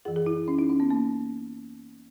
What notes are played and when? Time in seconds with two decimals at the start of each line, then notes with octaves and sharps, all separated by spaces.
0.05 F#2 E3 G#4
0.16 G#4
0.26 E4
0.48 C#4
0.59 D#4
0.69 C#4
0.80 B3
0.91 A#3